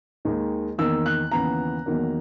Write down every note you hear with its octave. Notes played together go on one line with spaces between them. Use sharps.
D#2 D#3 G#3
E2 D#3 A#3 E6
F#6
D#2 C#3 E3 B3 A#5
E2 D#3 F#3 A#3